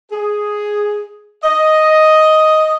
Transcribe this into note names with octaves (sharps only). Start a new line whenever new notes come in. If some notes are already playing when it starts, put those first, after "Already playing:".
G#4
D#5